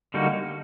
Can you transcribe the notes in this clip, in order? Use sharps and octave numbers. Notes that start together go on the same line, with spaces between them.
D3 G3 A#3 D#4 F#4